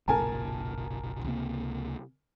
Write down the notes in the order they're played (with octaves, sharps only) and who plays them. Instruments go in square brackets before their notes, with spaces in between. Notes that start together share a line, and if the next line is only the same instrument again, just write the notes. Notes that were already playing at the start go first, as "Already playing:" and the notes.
[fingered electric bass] F#1 B1 A#2 [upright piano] A#4 G#5 A5
[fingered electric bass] C#2 C3 A#3